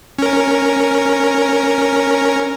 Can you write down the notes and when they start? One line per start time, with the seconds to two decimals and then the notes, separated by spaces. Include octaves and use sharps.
0.18 C#4 A#4